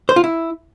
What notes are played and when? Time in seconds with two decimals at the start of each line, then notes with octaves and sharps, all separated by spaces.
0.09 C5
0.16 F4
0.24 E4